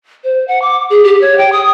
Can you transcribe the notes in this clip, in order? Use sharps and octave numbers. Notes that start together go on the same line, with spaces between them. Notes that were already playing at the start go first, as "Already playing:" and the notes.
C5
F#5
D6
G#4
G4
C#5
G5
D#6